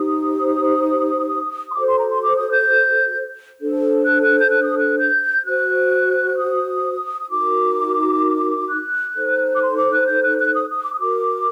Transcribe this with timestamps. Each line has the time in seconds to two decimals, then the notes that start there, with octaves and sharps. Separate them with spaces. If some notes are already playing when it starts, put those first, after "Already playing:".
Already playing: D#4 G4 C5 D#6
1.70 C6
1.74 F#4 A4 C5 D6
1.86 C6
1.98 A#5
2.09 C6
2.21 D6
2.36 D#6
2.51 G6
3.60 D4 A4 C5
4.06 F#6
4.22 F#6
4.37 G6
4.50 F#6
4.64 D#6
4.78 F#6
4.98 G6
5.44 F#4 C5 F#6
6.37 D#6
7.20 D#6
7.29 D#4 F#4 A#4 D6
8.68 F#6
9.15 D#4 A4 C5
9.54 D6
9.62 C6
9.77 D6
9.91 F#6
10.07 G6
10.22 F#6
10.38 F#6
10.54 D#6
10.69 D#6
10.84 D6
10.94 D#6
10.99 F#4 A#4 D6